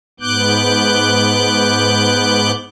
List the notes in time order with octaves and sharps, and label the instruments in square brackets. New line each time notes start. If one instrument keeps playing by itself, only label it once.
[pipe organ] G#2 B3 D6 F#6 G6